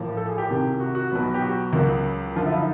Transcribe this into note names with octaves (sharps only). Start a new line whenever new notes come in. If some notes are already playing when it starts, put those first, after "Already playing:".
Already playing: A1 A2 F3 A#3
A4
G#4
G4
C2 C3 D#3
F#4
F#4
B1 B2 F#3 B3
G4
F#4
C#2 C#3 F#3 A#3
F#2 D3 F3 F4
E4
D#4